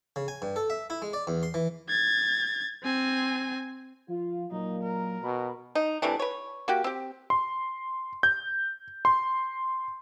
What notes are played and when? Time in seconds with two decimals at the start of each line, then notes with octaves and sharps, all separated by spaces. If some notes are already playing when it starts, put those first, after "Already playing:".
0.16 C#3
0.28 G#5
0.42 G2
0.56 A4
0.70 E5
0.90 E4
1.02 G#3
1.13 D5
1.27 E2
1.43 C6
1.54 E3
1.89 G#6 A6
2.83 C4 G#5
4.08 F3 F4
4.51 A#2 F#3 A#3 D#4
4.83 A#4
5.23 B2 B5
5.75 D#4
6.02 C3 E3 A3 D4
6.19 B4 C#5
6.68 A#3 F#4 G4
6.84 C4 G4
7.30 C6
8.23 G6
9.05 C6